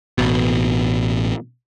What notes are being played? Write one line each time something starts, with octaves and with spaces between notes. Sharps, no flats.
A1 B2